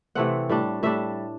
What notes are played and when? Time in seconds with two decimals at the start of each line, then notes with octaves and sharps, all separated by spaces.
0.15 C3 E3 A3 C4 F#5
0.49 A2 G3 D4
0.83 A2 G3 D4 E5